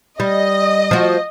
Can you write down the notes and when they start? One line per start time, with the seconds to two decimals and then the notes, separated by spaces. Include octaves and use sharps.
0.20 G3 D#5
0.91 F3 F#4